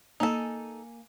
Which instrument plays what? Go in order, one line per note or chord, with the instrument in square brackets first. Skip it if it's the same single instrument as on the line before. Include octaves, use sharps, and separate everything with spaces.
[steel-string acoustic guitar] A#3 G#5 [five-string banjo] D#4 A4